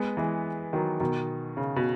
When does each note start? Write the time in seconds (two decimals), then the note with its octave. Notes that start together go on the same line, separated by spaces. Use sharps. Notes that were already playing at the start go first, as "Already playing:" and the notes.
Already playing: G#3 B3
0.17 E3 G#3
0.73 D#3 F#3
1.00 B2 D#3
1.57 C#3
1.76 B2